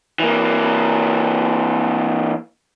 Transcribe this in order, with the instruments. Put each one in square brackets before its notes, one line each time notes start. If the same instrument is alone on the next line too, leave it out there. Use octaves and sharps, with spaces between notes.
[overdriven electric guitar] E3 A#3